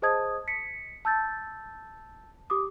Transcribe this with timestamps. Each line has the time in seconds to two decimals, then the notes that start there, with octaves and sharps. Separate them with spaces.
0.02 G#4 C5 D#5 A5 D#6 G#6
0.48 B6 C#7
1.05 A5 E6 G6 A6
2.50 G4 D6 D#6